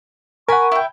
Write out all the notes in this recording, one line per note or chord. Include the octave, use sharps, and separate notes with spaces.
A#4 F#5 G#5 B5 C#6
E4 G5